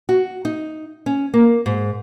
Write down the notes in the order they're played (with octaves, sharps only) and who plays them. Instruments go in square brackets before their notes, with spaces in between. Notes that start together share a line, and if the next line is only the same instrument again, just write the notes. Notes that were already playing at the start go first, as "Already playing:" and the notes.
[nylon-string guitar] F#4
D#4
C#4
A#3
G#2